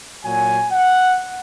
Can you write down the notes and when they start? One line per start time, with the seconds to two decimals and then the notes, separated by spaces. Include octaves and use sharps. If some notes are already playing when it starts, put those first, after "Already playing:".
0.24 A#2 F#3 G#5
0.72 F#5